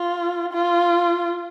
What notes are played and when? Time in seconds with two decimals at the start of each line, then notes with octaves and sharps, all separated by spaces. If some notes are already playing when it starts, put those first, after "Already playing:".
Already playing: F4
0.53 F4